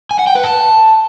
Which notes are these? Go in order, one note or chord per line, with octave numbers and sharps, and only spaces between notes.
G#5
F#5
G5
B4
A5